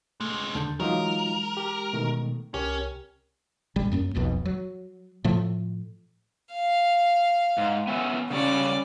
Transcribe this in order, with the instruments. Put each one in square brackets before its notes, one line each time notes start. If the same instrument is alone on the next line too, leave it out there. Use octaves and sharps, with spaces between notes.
[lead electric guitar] C3 G#3 [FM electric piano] A3
[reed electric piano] D#2 D3 G6 [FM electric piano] A5
[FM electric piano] E3 G#3 [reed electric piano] F#3 D#4 F4 [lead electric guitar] A#4
[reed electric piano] G4
B2 D#3 A3
[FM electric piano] C2 A#4 [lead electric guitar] C#4 [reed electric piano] G4
[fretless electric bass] A1 G3
F#2 A#3 C#4
D#1 B1 F2 B2
F#3
A2 F3 A3
[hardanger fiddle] F5
[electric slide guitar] G#2
B3 C#4 E5
[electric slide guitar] C#3 G3 C#5 [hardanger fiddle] C#4 D5